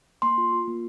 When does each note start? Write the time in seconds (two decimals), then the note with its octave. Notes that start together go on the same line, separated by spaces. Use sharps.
0.22 A#3 C6
0.38 F4
0.53 F4
0.68 A#3